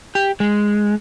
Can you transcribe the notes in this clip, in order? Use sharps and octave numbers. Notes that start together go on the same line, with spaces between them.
G4
G#3